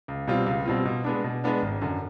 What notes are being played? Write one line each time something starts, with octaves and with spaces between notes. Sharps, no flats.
C#2
B2 G3 C4 F4
C#2
B2 G3 C4 F4
B2
G#3 B3 D4
B2
G#3 B3 D4
G#1
F#2 D3